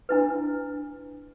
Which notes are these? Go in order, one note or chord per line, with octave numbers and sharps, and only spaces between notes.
D4 E4 B4